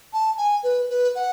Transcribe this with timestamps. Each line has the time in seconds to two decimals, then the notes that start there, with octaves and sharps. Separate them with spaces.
0.13 A5
0.38 G#5
0.63 B4
0.90 B4
1.15 F#5